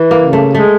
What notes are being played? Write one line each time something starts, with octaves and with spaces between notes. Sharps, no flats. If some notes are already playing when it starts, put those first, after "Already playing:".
Already playing: E3
A#3
C#3
A3
G#3 A3